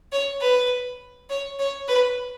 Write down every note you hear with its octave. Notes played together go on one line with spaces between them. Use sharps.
C#5
B4
C#5
C#5
B4